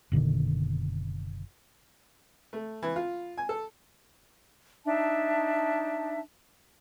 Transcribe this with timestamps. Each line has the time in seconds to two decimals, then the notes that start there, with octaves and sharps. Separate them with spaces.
0.12 F#1 B2 D3 D#3
2.53 A3
2.83 E3
2.96 F4
3.37 G#5
3.49 A4
4.86 D4 D#4 E5 A5